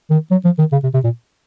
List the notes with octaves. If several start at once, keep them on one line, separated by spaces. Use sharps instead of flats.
D#3
F#3
F3
D#3
C#3
C3
C3
A#2